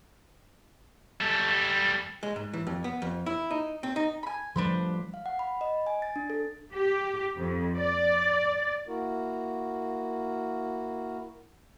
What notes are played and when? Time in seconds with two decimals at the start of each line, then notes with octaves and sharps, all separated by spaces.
1.20 G3 A4
2.23 G#3
2.36 G#2
2.53 E3
2.67 F2
2.84 B3
3.02 F2
3.26 E4
3.51 D#4
3.83 C4
3.96 D#4
4.23 G#5 B5
4.56 F3 G3 A3 D4 B4 C5
5.14 F5
5.26 F#5
5.39 B5
5.61 D#5
5.87 G#5
6.02 A6
6.16 D4
6.30 A4
6.73 G4
7.38 F2
7.77 D5
8.88 A#3 E4 F#4 A#4